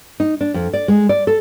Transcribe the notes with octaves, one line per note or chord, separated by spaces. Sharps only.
D#4
D4
F2
D5
G#3
D5
A4